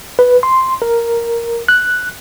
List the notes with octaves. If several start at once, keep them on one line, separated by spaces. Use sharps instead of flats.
B4
C6
A#4
F#6